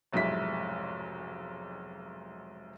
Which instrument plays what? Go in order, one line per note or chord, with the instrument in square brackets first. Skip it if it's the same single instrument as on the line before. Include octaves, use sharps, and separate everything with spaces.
[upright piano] F1 B1 G#2 E4 B6